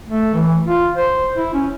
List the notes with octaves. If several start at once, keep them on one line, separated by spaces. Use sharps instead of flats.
A3
E3
F4
C5
E4
C#4